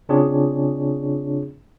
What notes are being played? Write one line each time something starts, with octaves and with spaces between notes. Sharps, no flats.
C#3 C4 D4 F4 G#4 C#5